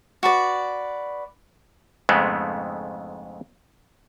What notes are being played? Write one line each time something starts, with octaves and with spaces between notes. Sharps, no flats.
F#4 B4 D5
F2 G#2 C#3 G#3 A3 B3